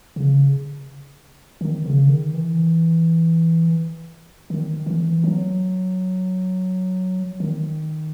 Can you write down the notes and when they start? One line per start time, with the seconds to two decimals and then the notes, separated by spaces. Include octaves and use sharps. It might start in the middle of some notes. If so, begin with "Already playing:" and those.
0.16 C#3
1.61 D#3
1.86 C#3
2.09 D#3
2.34 E3
4.50 D#3
4.86 E3
5.24 F#3
7.40 D#3